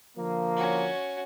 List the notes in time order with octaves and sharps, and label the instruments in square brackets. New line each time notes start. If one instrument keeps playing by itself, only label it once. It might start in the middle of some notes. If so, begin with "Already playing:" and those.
[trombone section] D3 F3 A#3
[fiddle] C#4 F#4